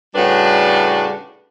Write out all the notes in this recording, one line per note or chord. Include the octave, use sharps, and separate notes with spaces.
A2 C#3 G3 D4 F#4 B4